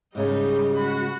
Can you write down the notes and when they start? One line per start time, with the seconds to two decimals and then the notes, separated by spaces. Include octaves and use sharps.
0.15 G#2 C#3 G3 G#3 D#4
0.75 F#4 B5